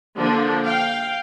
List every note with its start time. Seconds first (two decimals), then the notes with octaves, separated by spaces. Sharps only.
0.17 D3 F3 A#3 D4
0.64 F5 G5